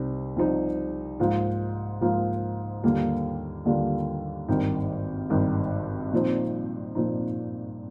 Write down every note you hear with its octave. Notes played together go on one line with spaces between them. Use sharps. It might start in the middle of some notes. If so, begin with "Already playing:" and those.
Already playing: C2 C3 C4 D#4
C2 C3 F3 C4 D#4
G#2 F3 A#3 F4
G#2 F3 A#3 F4
D#2 D3 G3 A#3 F4
D#2 D3 G3 A#3 F4
G#1 G2 D#3
G#1 G2 D#3
A#2 F3 C4 D#4
A#2 F3 C4 D#4